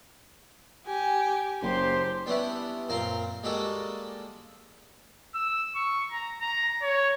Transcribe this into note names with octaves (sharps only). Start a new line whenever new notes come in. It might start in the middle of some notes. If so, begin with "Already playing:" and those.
G4 G#5
F#1 G4 C5 C6
G3 B3 C#4 D4 E4
F#2 A#2 C4 F5 A#5 C6
G3 G#3 A#3 F#4 A4 D#5
E6
C#6
A#5
A#5
C#5